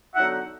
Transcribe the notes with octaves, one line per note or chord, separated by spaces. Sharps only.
D3 F#3 B3 D#4 E5 F#5